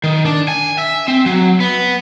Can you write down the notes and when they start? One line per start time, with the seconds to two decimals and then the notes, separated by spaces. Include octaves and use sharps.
0.04 D#3
0.25 D4
0.48 G#5
0.78 E5
1.08 C4
1.26 F#3
1.60 B3